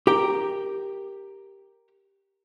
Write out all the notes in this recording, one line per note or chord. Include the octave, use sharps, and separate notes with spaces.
G4 A#4 G5